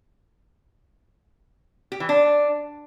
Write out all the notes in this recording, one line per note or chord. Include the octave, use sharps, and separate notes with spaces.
G4
E3
D4